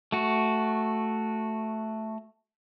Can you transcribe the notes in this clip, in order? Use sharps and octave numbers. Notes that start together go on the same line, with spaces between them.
A3 F#4